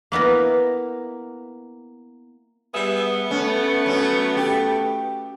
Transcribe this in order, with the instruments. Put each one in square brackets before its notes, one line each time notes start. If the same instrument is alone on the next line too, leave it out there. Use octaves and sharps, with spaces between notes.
[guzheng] A#3 B3 E4 A#4
[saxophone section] G3 G#4 E5 [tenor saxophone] B3
[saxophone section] A3 [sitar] C#4
[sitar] F#3 C#4
G4